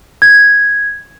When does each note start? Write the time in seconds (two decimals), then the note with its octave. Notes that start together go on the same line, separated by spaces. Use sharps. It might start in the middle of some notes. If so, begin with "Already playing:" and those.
0.22 G#6